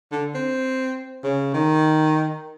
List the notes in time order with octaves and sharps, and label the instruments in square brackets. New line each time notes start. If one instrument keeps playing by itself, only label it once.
[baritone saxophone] D3
C4
C#3
D#3